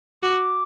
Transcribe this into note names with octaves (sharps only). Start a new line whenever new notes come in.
F#4 D6